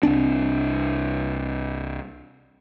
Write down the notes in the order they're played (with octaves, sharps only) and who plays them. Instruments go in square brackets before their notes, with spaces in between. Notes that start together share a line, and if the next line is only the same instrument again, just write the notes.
[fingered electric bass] C2 C4 D4